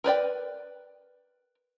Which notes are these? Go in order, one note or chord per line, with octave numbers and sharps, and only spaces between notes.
A#4 B4 D5 G5